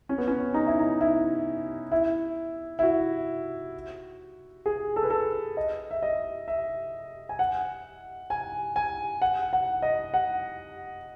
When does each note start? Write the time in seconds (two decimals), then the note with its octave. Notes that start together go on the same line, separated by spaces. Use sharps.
0.09 C#4
0.18 B3
0.27 C#4
0.54 D#4
0.67 E4
0.79 D#4
1.01 E4
1.92 E4
2.79 E4
2.83 F#4
4.66 G#4
4.96 A4
5.03 B4
5.10 A4
5.57 D#5
5.91 E5
6.02 D#5
6.48 E5
7.29 G#5
7.39 F#5
8.30 G#5
8.76 G#5
9.22 F#5
9.53 F#5
9.82 D#5
10.14 F#5